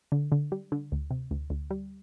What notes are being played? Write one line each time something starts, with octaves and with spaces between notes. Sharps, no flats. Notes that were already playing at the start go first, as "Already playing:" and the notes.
D3
D3
G3
D3
D2
C3
D2
D2
G3